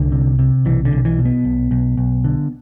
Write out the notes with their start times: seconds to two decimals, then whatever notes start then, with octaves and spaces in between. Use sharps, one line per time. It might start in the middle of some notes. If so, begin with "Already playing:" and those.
Already playing: C2 D3
0.12 C3
0.39 C3
0.65 B1 E3
0.85 D3
0.93 B1
1.05 E3
1.18 B2
1.25 B3
1.45 B1
1.71 B1
1.97 B1
2.24 D3